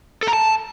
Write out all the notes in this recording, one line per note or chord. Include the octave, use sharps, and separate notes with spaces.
A4
A#5
A5